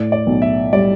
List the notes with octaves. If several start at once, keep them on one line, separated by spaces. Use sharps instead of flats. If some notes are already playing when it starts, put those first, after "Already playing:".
Already playing: A2 D5
D5
B1
E5
G3 D5